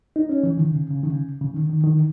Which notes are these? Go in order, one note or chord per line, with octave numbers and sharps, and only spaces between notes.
D#4
C#4
E3
D#3
C#3
C#3
D#3
C#3
C#3
D#3
D#3
D#3